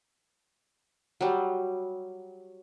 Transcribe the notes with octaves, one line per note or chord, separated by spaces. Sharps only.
F#3 G3